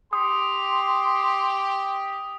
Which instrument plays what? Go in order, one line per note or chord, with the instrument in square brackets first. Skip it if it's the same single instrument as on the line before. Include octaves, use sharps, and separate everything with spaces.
[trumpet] G4 [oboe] C6 [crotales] D#6